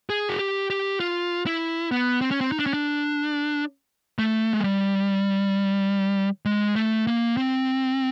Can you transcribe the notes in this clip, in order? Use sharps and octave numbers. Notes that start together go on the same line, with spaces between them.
G#4
F#4
G4
G4
F4
E4
B3
C4
C#4
C4
D#4
D4
C#4
D4
A3
G#3
G3
G#3
A3
A#3
C4